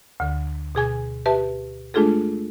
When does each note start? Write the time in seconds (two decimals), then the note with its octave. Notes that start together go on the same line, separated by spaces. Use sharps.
0.20 D2 D3
0.75 B2 G#4 G#5 G#6
1.26 G4 B4 E5 A5
1.94 G#3 A3 D4 F4 G#4 A4